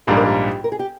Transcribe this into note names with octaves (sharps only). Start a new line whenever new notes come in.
A#1 G#2 G3 A#3 D4 G#4
A#4
G4
A#4
G#4
G4